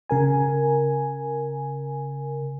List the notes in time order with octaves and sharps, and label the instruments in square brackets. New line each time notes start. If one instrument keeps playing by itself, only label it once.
[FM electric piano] C#3 A#4 G#5